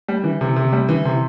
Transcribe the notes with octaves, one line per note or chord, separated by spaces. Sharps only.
G3
E3
C3
C3
G3
E3
C3